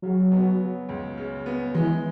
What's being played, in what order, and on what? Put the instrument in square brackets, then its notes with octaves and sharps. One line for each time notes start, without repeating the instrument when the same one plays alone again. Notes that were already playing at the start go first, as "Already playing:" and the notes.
[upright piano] C#3 [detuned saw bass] F#3
[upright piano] B3
F#3
C#2
C#3
B3
[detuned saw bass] E3 [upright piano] G#3